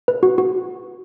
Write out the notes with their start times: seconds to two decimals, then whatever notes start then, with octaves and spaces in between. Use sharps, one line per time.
0.08 B4
0.23 F#4
0.38 F#4